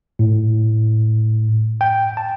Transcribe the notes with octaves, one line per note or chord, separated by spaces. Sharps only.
A2
G5
A5